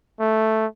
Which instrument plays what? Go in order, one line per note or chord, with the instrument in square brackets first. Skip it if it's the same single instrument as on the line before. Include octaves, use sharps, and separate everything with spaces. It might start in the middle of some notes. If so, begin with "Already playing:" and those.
[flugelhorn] A3